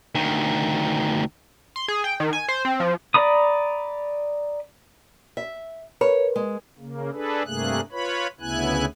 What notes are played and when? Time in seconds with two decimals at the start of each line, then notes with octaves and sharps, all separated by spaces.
0.15 D2 D#3
1.76 C6
1.88 G#4
2.04 G5
2.20 D#3
2.33 G#5
2.48 C5
2.65 C4
2.80 F3
3.14 D5 A#5 B5 D#6
5.37 E5
6.01 A#4 B4 C#5
6.36 G#3
6.79 C#3 A#3
7.13 D4 G#4 A4 B4
7.46 G2 C3 A3 A#3 G#4 F#6
7.92 F4 B4 C#5 B5
8.40 D2 C#3 B3 E4 G#5 F#6